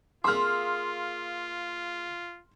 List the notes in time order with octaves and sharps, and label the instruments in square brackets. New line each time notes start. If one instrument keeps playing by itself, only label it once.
[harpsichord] A#3 G#4 E5 [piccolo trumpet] F4 [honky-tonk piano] C6 F6